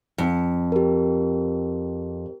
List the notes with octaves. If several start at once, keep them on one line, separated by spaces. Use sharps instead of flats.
F2
G4 A#4